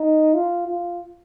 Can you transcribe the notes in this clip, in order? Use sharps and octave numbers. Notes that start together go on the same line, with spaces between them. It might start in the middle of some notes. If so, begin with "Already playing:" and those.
Already playing: D#4
F4
F4